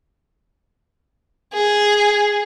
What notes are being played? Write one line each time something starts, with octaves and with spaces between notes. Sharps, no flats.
G#4